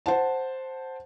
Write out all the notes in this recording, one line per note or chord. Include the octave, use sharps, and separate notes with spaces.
C5 F#5 A5